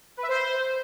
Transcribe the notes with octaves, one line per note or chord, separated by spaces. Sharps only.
B4
E5
C5